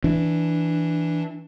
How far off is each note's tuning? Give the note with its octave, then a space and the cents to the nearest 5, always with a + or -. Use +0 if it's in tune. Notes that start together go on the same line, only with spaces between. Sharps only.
E3 +0 D4 +0